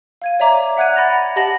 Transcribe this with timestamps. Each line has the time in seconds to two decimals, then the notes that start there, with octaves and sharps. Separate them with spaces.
0.22 F5 G#6 D#7
0.40 C#5 D5 E5 A#5 D6
0.77 E5 F#5 F#6 G#6 D#7
0.96 F#5 B5 A6 A#6 F7
1.36 G4 D#5 F#5 A5 A#6 F#7